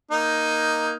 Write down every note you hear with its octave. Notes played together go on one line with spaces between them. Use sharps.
A#3 D#4